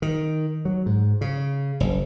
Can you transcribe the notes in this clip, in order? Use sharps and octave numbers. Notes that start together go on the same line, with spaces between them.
D#3
F#3
G#2
C#3
F#1